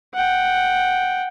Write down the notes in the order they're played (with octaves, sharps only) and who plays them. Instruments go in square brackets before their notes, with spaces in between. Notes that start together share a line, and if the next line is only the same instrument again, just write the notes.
[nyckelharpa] F#5 G5